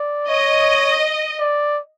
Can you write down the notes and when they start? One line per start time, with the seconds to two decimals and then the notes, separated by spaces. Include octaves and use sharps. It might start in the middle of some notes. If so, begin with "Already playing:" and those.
Already playing: D5
0.29 C#5 D#5
1.40 D5